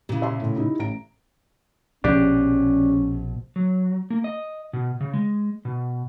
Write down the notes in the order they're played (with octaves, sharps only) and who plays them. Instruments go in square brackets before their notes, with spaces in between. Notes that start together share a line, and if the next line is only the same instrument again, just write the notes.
[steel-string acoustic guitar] A#2 C#3 [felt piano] E4 G4
[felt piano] E5 A5 C6
A2
D#4 E4 G4
A1 A#5 D7
[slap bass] A#1 B2 F3 [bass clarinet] C#4 [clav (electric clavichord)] D4 G4
[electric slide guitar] F#3
A#3
D#5
B2
C#3
G#3
B2